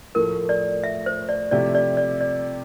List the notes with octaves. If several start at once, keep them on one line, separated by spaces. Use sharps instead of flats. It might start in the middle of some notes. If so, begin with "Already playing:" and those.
A2 F3 A3 A#4
D5
E5
C5
D5
C3 F3 A3 E4 G4 D5
D5
D5
D5